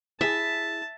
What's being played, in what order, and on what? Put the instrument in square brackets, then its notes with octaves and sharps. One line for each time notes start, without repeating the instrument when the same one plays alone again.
[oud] E4 G#4 [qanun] E5 [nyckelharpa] A5